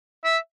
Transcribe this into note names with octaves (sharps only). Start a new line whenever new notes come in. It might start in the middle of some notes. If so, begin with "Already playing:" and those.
E5